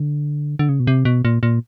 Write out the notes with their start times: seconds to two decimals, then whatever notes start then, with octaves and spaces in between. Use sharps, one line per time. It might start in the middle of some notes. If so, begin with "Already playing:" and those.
Already playing: D3
0.59 D3
0.69 C#3
0.80 B2
0.87 C3
1.05 B2
1.25 A#2
1.43 A#2